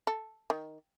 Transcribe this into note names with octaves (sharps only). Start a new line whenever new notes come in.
A4
D#3